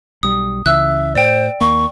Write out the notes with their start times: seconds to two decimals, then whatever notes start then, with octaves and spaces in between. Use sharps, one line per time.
0.23 B1 G3 D#6
0.66 C#2 C#3 E3 E5 E6 F#6
1.15 A2 C5 D5 G5
1.61 D#2 A#3 C#6